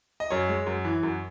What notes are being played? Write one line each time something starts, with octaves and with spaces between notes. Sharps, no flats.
D#5
F#2 C#5
G#3
F#2
E3
F#2